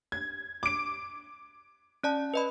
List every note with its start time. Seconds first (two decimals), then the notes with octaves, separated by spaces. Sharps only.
0.12 G#6
0.63 D6 D7
2.03 C#4 D5 A5
2.34 B4 D#5 B5